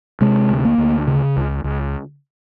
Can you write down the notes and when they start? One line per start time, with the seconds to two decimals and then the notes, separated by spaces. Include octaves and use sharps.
0.21 C3 G#3
0.50 D2
0.65 A#3
0.78 D2
1.07 C#3
1.37 C#2
1.64 C#2